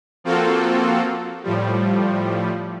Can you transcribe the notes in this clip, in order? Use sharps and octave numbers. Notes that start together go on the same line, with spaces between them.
F3 A#3 C4 F4 F#4 A4
A2 F3 G3